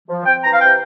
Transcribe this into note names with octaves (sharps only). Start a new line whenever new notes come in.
F3
C4 G5
E3 A#5
F5
C3 G5